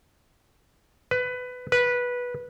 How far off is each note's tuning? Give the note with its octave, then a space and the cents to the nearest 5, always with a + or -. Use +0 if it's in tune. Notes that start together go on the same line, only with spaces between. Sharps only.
B4 +15
B4 -15